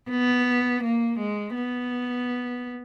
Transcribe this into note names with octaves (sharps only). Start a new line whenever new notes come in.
B3
A#3
G#3
B3